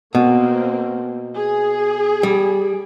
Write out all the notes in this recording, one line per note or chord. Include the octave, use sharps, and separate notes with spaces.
B2 A#3 C4
G#4
G3